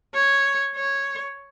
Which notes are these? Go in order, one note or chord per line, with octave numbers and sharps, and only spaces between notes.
C#5
C#5